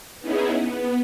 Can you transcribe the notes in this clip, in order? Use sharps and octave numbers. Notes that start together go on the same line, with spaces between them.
B3 C#4 D#4 E4 G#4
B3